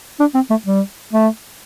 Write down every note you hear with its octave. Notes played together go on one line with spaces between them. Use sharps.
D4
C4
A3
G3
A3